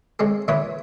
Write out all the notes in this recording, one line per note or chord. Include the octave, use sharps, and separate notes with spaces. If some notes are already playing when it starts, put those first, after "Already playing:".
C#3 G#3 C4 A4
A#2 D3 E3 E4 C#5 D#6